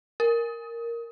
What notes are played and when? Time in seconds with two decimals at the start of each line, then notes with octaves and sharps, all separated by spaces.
0.20 A#4